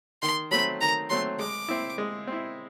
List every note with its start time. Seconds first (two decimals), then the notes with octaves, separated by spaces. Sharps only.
0.22 D#3 C6
0.51 F#3 A3 C4 B5
0.81 D#3 A#5
1.10 F#3 A3 C4 C6
1.39 G#3 D6
1.69 C4 E4
1.98 G#3
2.27 C4 E4